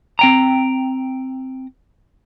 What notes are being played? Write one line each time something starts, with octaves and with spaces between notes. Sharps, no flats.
C4 G5 A#5